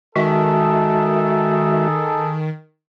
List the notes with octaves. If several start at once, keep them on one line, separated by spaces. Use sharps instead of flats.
D#3 G#3 D#4 F#4 G#4 A4 E5